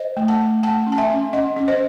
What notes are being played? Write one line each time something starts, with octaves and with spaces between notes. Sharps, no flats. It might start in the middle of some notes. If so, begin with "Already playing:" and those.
Already playing: C5 D#5
A3
F#5 A5
A3
A3 F#5 A5
C#4
A5
E5 G#5
C#4
C#4 D#5 F#5
C#4
C5 D#5